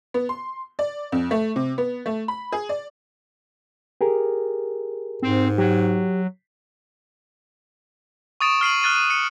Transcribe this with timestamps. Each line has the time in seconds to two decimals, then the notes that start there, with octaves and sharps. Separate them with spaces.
0.14 B3
0.29 C6
0.79 D5
1.12 F2
1.31 A3
1.56 C3
1.78 B3
2.06 A3
2.28 B5
2.52 G#4
2.69 D5
4.01 G4 G#4 A#4
5.22 G#2 C4
5.58 F#3 G4
8.41 C#6 D#6 A6 D7 E7
8.61 F6 C7 D#7 F#7
8.83 F6 F#6 A6 D#7
8.96 D#7
9.10 C#7 D#7